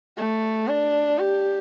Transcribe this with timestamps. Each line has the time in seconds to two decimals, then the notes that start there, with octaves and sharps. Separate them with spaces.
0.17 A3
0.68 D4
1.19 G4